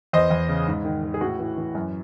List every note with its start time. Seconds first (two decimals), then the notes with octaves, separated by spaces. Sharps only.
0.13 E2 C5 D#5
0.31 E2
0.49 C#3
0.68 G#2
0.85 D#3
1.04 D#3
1.14 G#4
1.21 A2 F#4
1.39 E3
1.57 E3
1.75 F#2